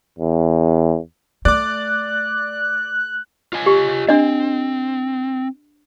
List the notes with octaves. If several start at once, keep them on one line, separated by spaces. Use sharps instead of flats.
E2
A3 D5 D6 F#6
F4 D#5 G#5
G4
C4 D4 D#5